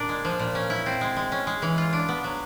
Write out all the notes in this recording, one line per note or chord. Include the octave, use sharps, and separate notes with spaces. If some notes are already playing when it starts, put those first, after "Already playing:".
Already playing: A#2 A#3 D4
G#3
F3
A#2
C#4
E4
C4
G#3
G#3
C#4
G#3
E3
F4
D4
B3
F#3